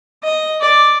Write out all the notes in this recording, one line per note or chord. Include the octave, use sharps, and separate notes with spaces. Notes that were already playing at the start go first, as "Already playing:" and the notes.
D#5
D5